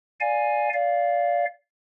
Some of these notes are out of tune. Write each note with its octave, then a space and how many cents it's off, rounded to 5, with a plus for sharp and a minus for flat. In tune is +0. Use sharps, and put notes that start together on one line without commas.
D5 +0 F5 +15 G#5 +0
D5 -25 F5 +0